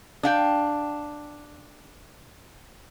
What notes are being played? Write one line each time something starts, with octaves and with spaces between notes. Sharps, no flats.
D4 F5 G5